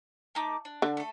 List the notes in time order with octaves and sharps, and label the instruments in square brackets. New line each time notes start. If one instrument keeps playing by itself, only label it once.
[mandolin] A3 D#4 D6
D4
[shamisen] D3
[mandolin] A3 A4